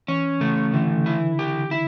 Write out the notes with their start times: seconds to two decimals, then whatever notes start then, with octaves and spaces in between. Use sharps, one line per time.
0.08 E3 C#4
0.40 C#3 A3
0.74 D3 E3
1.06 E4
1.39 G4
1.71 E4